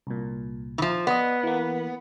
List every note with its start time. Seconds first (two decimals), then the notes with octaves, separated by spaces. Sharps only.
0.07 C2 A#2
0.78 E3 F3
1.07 B3 D5 D#5
1.43 E3 A#3